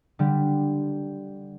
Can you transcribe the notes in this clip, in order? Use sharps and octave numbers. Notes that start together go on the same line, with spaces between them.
D3 G3 G4